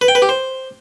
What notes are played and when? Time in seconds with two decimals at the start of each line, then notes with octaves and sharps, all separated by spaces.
0.01 B4
0.08 G5
0.15 B4
0.22 G4
0.29 C5